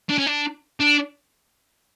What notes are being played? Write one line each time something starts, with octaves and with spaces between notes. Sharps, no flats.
D4
C#4
D4
D4